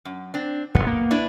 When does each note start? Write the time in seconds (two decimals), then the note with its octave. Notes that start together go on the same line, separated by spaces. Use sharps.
0.05 F#2
0.34 C4 D4
0.75 E1 E2 B3
0.87 A#3
1.11 D4 E4 B4